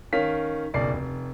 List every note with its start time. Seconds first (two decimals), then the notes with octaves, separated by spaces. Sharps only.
0.13 D#3 C#4 F5 B6
0.74 F#1 B1 D5 C7
0.93 F1